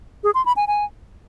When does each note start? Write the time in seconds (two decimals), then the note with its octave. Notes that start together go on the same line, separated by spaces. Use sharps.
0.24 G#4
0.35 C6
0.46 B5
0.56 G#5
0.67 G#5